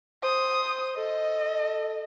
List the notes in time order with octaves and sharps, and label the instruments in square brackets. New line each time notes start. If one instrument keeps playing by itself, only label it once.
[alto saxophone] C5 [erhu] D#6
[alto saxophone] A4 [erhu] D#5